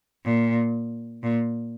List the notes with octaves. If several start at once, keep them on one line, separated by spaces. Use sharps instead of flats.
A#2
A#2